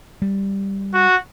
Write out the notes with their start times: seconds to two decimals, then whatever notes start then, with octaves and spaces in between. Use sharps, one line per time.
0.22 G3
0.94 F#4